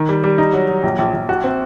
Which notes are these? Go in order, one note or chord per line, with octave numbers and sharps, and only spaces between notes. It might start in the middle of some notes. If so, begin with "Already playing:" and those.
Already playing: D#3
G3
G3
D#4
F#3
F#3
A#1
A#1
A#1
F#4
C4